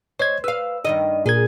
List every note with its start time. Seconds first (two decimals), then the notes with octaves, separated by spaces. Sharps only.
0.20 C5 C#5 D#5 G#6
0.44 B4 F5 E6
0.85 G2 D#3 D#5
1.26 A#2 G#4 A#4 G#6